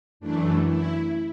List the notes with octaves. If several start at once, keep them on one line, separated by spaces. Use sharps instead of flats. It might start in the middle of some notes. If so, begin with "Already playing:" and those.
F#2 E3 A3 D4
E4